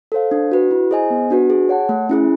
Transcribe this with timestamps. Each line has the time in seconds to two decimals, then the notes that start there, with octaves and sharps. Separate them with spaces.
0.12 A4 C5 F5
0.31 D4
0.52 F#4 B4
0.71 E4
0.91 G#4 C5 D#5 G#5
1.10 B3
1.30 D4 F#4 B4
1.50 G#4
1.69 C#5 F#5 A5
1.89 A3
2.09 C#4 E4 G#4